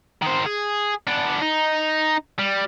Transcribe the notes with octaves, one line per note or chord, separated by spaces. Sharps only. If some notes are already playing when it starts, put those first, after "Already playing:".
D#3 C5
G#4
B3 D4
D#4
G3